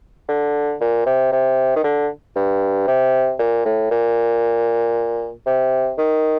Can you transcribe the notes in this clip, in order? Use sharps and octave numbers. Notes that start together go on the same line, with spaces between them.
D3
A#2
C3
C3
D#3
D3
G2
C3
A#2
A2
A#2
C3
D#3